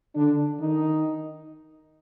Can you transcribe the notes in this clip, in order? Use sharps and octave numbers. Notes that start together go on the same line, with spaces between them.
D3 D4
D#3 D#4